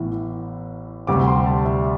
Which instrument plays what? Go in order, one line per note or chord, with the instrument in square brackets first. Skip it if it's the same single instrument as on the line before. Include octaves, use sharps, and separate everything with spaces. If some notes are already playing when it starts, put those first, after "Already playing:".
Already playing: [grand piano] A1 A2 E3 B3
D2 C3 G3 D6
C6
A5
E5